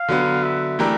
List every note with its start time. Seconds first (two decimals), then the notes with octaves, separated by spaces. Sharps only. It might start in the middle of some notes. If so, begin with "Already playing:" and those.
Already playing: F5
0.08 D3 F#3 B3
0.43 E5
0.79 E3 A3 D4 G4 A#4